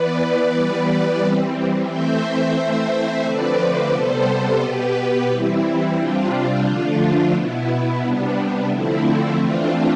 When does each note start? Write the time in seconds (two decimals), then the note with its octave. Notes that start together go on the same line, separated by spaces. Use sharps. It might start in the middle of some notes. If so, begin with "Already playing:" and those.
Already playing: E3 B3 B4 D5
0.51 E3 G3 B3
1.19 E3 G3 C4
1.86 E3 A3 C4 C5 E5
2.55 E3 A3 C4
3.23 D3 F3 A3 C4 B4 D5
3.91 C3 G3 B3 A4 C5
4.59 B2 B3 G4 B4
5.27 E3 G3 C4 E4
5.96 C3 G3 C4 D4 F4
6.64 D3 F3 A3
7.32 B2 B3 E4
7.66 E4
8.00 C3 G3 B3 D4
8.68 D3 F3 A3 C4 E4
9.36 E3 A3 C4 D4 F4